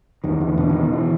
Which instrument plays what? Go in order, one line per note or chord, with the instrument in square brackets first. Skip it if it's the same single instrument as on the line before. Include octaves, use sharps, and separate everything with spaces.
[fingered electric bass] E2 D#3
E2
D3
B2
D#3
B2
E3